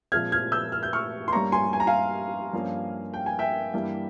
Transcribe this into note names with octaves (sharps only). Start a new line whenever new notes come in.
A#2 F3 G#3 C4 F6 G#6
F6 G#6
E6 G6
F6
G6
C#6 F6
C6
G2 G3 A#3 C#4 A#5 C#6
G#5 C6
G#5
A#5
F5 G#5
G2 F3 A#3 C#4
G5
G#5
E5 G5
G2 E3 G3 A#3